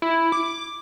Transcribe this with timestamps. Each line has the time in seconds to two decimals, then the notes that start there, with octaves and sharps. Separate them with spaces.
0.02 E4
0.32 D6